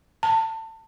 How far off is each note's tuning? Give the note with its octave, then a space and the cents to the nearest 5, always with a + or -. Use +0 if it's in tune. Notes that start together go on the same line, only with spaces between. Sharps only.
A5 +25